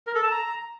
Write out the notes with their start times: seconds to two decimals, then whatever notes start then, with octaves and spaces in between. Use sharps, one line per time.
0.07 A#4
0.15 A4
0.23 A5
0.31 A#5